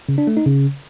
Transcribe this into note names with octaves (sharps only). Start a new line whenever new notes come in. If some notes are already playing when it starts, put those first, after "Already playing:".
C#3
D4
A3
D#4
C#3